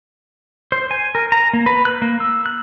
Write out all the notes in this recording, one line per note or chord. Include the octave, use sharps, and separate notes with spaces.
C5
G#5
A#4
A#5
A#3
B4
F#6
A#3
E6
F#6